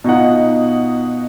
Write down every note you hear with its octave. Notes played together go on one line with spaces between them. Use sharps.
B2 D#4 F4 F#5